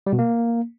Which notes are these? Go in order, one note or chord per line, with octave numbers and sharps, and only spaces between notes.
G3
B2
A#3